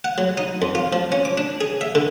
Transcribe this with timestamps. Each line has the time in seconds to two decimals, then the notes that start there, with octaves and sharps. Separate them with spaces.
0.04 F#5
0.18 F#3
0.38 D#4
0.62 F2
0.75 F4
0.93 F3
1.12 C#4
1.25 D6
1.38 D4
1.61 G#4
1.81 E5
1.95 D3